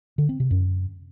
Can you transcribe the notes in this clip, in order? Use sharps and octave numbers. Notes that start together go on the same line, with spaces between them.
D3
C4
C3
F#2